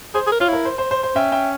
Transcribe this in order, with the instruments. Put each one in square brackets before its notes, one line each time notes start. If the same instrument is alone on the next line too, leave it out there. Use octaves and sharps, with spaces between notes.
[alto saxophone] G#4 [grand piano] C5
[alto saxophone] G#4
A#4
[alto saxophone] F4 [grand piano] C#5 F5
[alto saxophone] E4 [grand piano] A#4
[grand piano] C5
C5
C5
C5
[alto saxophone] C#4 [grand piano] E5 G5
[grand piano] E5 G5